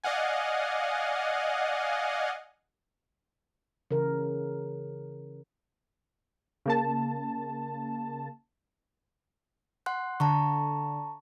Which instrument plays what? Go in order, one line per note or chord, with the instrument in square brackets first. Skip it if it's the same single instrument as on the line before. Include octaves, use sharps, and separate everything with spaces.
[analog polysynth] D5 D#5 F5 F#5 G#5
[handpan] C#3 E3 A#4
[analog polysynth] C#3 A#3 A5
[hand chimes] F#5 C6 F#6
[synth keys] D3 [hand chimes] A5 A#5 C#6